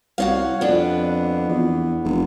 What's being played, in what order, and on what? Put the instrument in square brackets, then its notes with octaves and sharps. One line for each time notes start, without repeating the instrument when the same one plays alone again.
[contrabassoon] C2 [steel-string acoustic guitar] F#4 C#5 F5
[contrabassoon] F2 [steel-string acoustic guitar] B3 D4
[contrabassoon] E2
F1